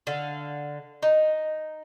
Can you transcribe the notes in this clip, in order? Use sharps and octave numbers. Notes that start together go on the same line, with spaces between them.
D3 F5
D#4